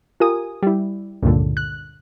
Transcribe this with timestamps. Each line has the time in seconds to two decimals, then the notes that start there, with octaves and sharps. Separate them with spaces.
0.20 F4 G4 A#4 G#5 D#6
0.63 G3 E4
1.23 C#2 G2 A#2 D3
1.57 F#6